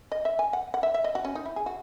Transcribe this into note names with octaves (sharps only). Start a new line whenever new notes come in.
D#5
E5
G#5
F#5
F#5
E5
E5
D#5
F#4
C#4
D#4
E4
G#4
F#4